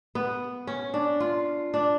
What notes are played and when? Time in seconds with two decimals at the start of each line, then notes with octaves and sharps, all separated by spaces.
0.15 B3
0.67 C#4
0.94 D4
1.20 F4
1.74 D4